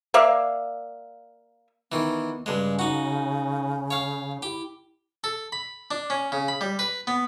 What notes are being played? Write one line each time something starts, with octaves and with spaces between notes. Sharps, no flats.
A#3 D5 E5 F5
D#3 E3 B3
G2 C#3 G#3
D#4 F#4
C#5 F5
E4 G4
A4
B5
D4
C#4
C#3
B5
G3
B4
B3